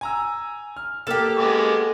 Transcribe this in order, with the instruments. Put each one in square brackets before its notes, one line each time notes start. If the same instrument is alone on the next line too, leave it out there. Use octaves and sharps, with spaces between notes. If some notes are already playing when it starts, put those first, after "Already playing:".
[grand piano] G#5 A#5 E6
F6
[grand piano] A#3 F6 E7 [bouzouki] G4 A4
[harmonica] G#3 B3 D6